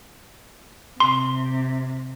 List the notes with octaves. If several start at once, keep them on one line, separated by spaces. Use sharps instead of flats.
C3 C6